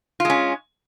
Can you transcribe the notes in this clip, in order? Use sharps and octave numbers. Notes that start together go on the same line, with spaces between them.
G#3 C#4 F4